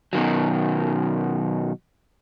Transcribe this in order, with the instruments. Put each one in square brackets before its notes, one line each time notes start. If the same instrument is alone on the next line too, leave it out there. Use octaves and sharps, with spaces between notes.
[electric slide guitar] B2 D#3 F#3